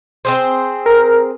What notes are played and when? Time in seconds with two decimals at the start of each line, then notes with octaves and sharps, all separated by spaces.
0.25 C4 G#4 C5
0.86 A#4